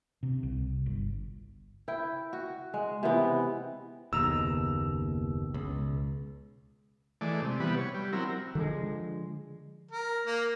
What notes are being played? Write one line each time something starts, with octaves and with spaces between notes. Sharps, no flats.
C3
C2
G1
E4 G5
F#4
G#3
C3 E3 B3
F#1 D#2 B2 A#5 E6
C#2
E3 G#3 A3 D5
C3
E3 G3 B3 B4
C#5
G3
F#3 C4 E4 A#4
D3 F3 G#3
A#4
A#3